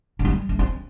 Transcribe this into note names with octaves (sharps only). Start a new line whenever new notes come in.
D#3
F3
G3
A3
C4